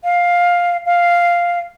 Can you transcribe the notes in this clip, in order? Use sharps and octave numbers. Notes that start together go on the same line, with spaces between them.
F5
F5